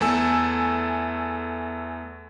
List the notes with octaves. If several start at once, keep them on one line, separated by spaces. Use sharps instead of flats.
E2 A3 A4 G#5 E6